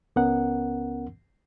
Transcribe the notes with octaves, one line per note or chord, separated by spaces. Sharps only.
C#2 B3 C#4 A#4 F#5